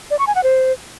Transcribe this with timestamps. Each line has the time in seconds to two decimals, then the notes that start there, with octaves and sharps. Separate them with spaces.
0.11 D5
0.19 C#6
0.27 G#5
0.35 F#5
0.43 C5